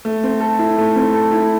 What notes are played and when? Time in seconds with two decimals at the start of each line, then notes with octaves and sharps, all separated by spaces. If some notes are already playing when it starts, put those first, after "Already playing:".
0.05 A3
0.24 C4
0.41 A4
0.59 E4
0.78 A3
0.96 C4
1.14 A4
1.32 E4